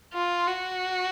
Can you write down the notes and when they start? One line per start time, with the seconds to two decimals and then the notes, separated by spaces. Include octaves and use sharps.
0.14 F4
0.48 F#4